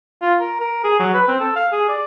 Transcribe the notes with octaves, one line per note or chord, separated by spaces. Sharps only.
F4
A#4
A#4
G#4
F#3
B4
C4
A4
F5
G#4
D5